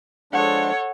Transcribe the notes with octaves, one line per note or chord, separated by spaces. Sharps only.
F3 G#3 D4 A4 C#5 F#5